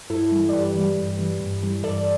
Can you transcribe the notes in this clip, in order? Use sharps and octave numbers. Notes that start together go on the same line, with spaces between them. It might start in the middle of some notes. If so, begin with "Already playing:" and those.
G2 E4 A4
E3 G3
D5
G2 G4 B4
E3 G3
G2
E3 G3
G2
E3 G3
G2 A4 D5